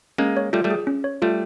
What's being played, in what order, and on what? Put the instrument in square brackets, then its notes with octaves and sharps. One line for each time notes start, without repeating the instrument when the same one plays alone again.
[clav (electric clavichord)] G#3 A#3 [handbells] C#4
[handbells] C#5
[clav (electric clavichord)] G3 A3 [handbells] F4
[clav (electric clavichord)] G3 A3
[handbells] G#4
C#4
C#5
[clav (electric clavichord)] G3 A3 [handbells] F4